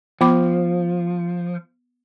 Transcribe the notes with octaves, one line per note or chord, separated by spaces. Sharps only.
F3 B3 B5 D6